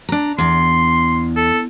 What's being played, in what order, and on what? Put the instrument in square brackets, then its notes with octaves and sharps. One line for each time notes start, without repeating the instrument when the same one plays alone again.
[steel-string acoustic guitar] D4 A#5
[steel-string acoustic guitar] E2 [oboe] C6
[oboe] A4